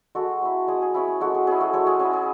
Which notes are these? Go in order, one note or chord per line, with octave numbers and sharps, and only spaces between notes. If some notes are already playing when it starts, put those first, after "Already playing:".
G#3 F#4 A4
C#4 E4
G#3 G#4
G#4
C#4 E4 G#4
G#4
G#3 F#4 A4
G#4
C#4 E4 G#4
F#4 A4
G#3 A4 C#5
G#4
C#4 E4 G#4
G#4